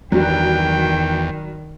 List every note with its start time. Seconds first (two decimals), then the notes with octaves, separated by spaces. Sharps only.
0.12 E2 G2 D#3 F#3 G5